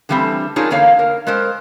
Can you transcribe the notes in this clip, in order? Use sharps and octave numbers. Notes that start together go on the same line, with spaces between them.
D3 E3 G3 A3 C4
D4 D#4 F4 G#4 A#4 C#5
E2 D3 A#3 C#5 F5
A#4
G#3 A#4 C5